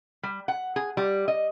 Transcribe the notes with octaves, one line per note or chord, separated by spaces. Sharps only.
G3
F#5
G#4
G3
D#5